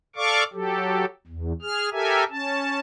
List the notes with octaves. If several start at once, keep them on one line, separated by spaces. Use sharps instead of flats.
A4 D5 F5 C#6 D6
F#3 G4 A4
E2
G#4 F6
G4 A4 A#4 E5 G#5
C#4 A5